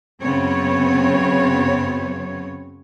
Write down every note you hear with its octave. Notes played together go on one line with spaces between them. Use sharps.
F#2 C#3 B3 C4 C#5